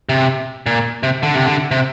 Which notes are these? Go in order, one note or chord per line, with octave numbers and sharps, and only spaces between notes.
C3
A#2
C3
D3
C3
D3
C3